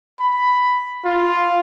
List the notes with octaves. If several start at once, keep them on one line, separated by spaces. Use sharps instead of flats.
B5
F4